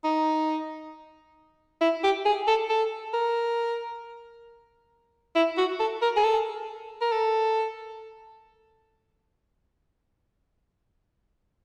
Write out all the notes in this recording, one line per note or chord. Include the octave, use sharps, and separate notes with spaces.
D#4
E4
G4
G#4
A4
A4
A#4
E4
F#4
A4
A#4
G#4
A4
A#4
A4